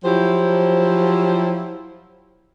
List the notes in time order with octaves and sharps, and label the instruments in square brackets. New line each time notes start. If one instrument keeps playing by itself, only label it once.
[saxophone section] F3 F#3 E4 G4 C5